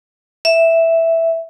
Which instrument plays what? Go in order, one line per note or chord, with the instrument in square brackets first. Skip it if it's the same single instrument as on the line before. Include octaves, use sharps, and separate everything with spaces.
[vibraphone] E5